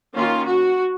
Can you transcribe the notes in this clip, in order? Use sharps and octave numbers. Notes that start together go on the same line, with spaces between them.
D#3 A#3 C#4 F4
F#4